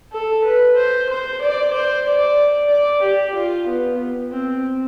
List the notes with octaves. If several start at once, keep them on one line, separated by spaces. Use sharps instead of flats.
A4
B4
C5
C5
D5
C5
D5
D5
G4
F4
B3
C4